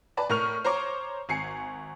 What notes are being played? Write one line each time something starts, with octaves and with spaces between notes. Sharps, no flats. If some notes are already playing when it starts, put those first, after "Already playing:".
B4 D5 A5
A2 A#4 C#6 F6 F7
C5 C#5 A#5 C#6 D6
G#1 G#5 C7 C#7